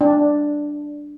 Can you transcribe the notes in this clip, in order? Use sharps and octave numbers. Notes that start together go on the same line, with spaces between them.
D4